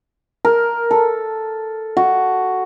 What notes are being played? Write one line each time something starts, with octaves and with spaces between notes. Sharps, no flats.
A#4
A4
F#4